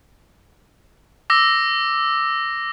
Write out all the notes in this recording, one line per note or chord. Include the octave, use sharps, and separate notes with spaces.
D6 E6 A#6